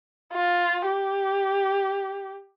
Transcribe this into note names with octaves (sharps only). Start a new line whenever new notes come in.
F4
G4